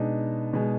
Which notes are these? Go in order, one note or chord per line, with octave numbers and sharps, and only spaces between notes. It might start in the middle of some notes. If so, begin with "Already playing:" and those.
Already playing: B2 G#3 D4 D#4
B2 G#3